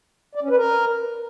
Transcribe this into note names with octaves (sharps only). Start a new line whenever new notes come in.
D5
C#4
B4
A#4